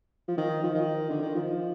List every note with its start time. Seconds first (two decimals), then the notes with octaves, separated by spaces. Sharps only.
0.28 F3
0.38 D#3
0.63 F3
0.75 D#3
1.10 D3
1.22 D#3
1.35 F3